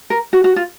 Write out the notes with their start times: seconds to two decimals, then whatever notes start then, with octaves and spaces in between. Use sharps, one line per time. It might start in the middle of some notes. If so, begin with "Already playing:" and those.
0.10 A#4
0.33 F#4
0.44 F#4
0.56 F4